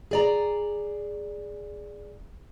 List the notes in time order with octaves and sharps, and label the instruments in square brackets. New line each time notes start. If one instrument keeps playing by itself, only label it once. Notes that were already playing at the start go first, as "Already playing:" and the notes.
[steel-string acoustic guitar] G#4 D5 A#5